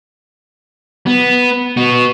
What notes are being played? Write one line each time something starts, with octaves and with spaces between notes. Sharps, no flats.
B3
B3 F#4